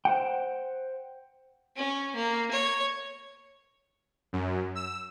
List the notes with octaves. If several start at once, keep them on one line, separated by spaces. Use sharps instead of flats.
C5 F#5 G5
C#4
A#3
C#5
F#2
E6